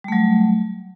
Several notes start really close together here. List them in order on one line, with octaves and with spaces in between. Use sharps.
G3 A3 F#3